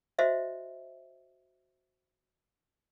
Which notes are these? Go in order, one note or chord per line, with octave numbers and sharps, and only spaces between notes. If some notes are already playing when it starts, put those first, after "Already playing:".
F#4 C5 D#5 E5